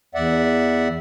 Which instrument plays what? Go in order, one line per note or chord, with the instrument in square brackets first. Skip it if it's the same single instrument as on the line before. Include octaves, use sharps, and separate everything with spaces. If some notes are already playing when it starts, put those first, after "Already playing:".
[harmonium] E2 D5 E5 F#5